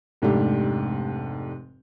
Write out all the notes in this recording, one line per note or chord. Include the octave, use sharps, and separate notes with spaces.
F1 G#2 A3 D4 G4